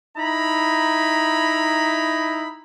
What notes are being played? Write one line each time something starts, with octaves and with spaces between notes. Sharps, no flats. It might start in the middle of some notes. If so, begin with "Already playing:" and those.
D#4 E4 A#5 B5